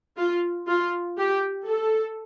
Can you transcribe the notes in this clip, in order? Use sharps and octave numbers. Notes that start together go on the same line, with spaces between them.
F4
F4
G4
A4